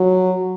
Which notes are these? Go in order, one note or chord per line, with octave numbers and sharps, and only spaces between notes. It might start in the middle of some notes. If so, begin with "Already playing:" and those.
Already playing: F#3